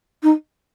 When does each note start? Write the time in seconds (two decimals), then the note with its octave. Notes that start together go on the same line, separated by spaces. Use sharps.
0.23 D#4